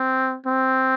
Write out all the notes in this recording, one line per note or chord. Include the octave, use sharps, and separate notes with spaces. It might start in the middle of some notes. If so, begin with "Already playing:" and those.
Already playing: C4
C4